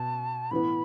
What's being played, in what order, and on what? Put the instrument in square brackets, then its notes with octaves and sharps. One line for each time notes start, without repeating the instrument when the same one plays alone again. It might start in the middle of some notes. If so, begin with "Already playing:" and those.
Already playing: [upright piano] B2 [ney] A5
[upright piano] A2 E3 B3 [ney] B5